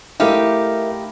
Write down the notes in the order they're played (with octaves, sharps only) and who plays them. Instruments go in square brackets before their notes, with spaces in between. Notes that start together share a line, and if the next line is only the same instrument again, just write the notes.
[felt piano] A3 E4 [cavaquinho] D#4 G4 F5 [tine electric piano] A#4 E5